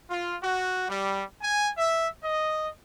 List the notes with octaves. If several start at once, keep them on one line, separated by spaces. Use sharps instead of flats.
F4
F#4
G3
G#5
E5
D#5